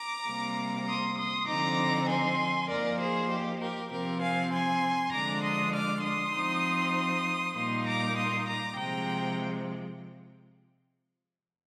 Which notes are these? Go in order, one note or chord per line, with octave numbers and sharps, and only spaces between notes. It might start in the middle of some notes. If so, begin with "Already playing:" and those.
Already playing: A#5 D6
C3 G3 A#3
C6 D#6
C6 D#6
D3 F3 C4 D#4 A#5 D6
G#5 C6
F3 A#3 D#4 A#4 D5
G#4 C5
G4
G4 A#4
C3 F3 C4 G4 A#4
F5 G#5
G#5 C6
D3 F3 G#3 D4 A#5 D6
C6 D#6
D6 F6
C6 D#6
F3 C4 D#4
A#2 G3 A#3 D#4 C6 D#6
A#5 D6
C6 D#6
A#5 D6
C3 F3 G#3 G5 A#5